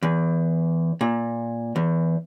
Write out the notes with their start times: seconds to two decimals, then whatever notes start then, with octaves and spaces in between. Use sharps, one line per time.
0.03 E2
1.01 A#2
1.76 E2